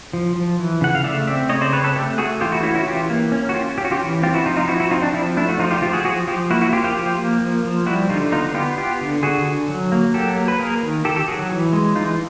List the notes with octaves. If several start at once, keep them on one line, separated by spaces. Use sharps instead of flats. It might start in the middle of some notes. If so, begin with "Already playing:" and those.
F3
F3
E3
C#3 F#5
F5
A3 D5 E5
C4 D5 E5
C#3 C#5 D#5
C5 D5
C4 B4 C#5
A4 B4
A3 G4 A4
A3 F#4 G#4
E3 F4 G4
E4 F#4
C#4 E4 F#4
E4 F#4
E3 F4 G4
A#3
C#4
F#4
C#4 F4 G4
C#4 G4
F#4
F4 G4
E3
C4 F4 G4
E4 F#4
F3 D#4 F4
D#4 F4
F3 E4 F#4
E4 F#4
C4 D#4 F4
D4
F3 D4 E4
A3 D4 E4
F#4
F3 D#4 F4
F4 G4
F3 F4 G4
F#4 G#4
F3 F#4 G#4
F3 F4 G4
A#3 E4 F#4
E4 F#4
F3 F4 G4
F4 G4
F3
A#3
F3
F3
G3 E4 F#4
D3 D#4 F4
B3 D#4 F4
B3 F4 G4
B3 F4 G4
D3
D3 F#4 G#4
D3
F#3
A#3
F#3 G4 A4
A#3
B4
A#3 G#4 A#4
D#3
D#3 G4 A4
G4 A4
F#3 F#4 G#4
E3
G#3
E3 D#4 F4